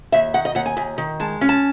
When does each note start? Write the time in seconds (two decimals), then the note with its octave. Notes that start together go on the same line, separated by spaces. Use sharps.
0.12 D#2 E5
0.34 D#3 F#5
0.45 D#5
0.55 D#2 F#5
0.66 G#5
0.77 D#2
0.98 D#3
1.20 G#3 A5
1.41 C#4
1.49 A5